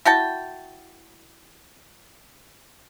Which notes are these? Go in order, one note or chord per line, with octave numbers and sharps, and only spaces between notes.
E4 F#4 G5 A5